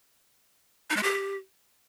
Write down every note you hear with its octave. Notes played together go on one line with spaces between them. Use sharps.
D#4
G#3
G4